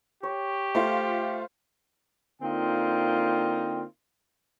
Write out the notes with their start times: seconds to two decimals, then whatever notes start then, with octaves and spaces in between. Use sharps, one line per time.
0.23 G4 C#5
0.75 A3 F4 C5
2.41 D3 A#3 C4 D#4 F4 G5